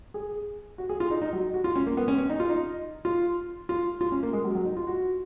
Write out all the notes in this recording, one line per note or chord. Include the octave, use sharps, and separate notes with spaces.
G#4
F#4
G#4
F4
D#4
D#4
F#3
F#4
F4
C#4
A#3
B3
C#4
C#4
D#4
F4
D#4
F4
F4
F4
C#4
A#3
G#3
F#3
F#3
D#4
F4
F#4